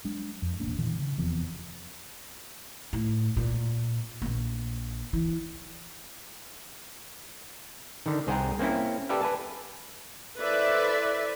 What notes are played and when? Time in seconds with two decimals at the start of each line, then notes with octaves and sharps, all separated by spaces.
0.05 F#3 G#3 D4
0.42 F2
0.60 E1 A1 A#3 D4
0.79 A#2 D#3 E3 F#3
0.99 C#3
1.18 F1 E2 F3 C4
2.93 A2
3.37 A#2
4.22 A#1 A#3
5.13 E3
8.06 D3 D#3
8.27 C2 G#4 C5 F#5 G5 A#5
8.59 A#3 C4 C#4 E4
9.09 G4 A4 B4 D5 E5 F5
9.21 B4 G#5 A5
10.39 E4 A4 B4 C5 D5 E5